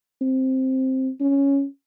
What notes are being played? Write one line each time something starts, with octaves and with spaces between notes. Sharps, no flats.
C4
C#4